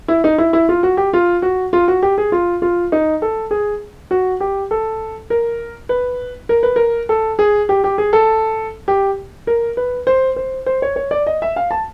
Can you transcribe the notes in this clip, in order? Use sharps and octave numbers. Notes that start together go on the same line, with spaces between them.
E4
D#4
E4
E4
F4
F#4
G4
F4
F#4
F4
F#4
G4
G#4
F4
F4
D#4
A4
G#4
F#4
G4
A4
A#4
B4
A#4
B4
A#4
A4
G#4
G4
G4
G#4
A4
G4
A#4
B4
C5
C5
C5
C#5
C#5
D5
D#5
E5
F5
A5